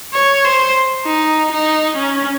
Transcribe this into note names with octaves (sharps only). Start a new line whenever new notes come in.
C#5
C5
D#4
D#4
C#4